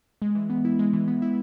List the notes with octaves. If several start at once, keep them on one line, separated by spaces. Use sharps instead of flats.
G#3
E3
B3
E4
G#3
E3
B3
E4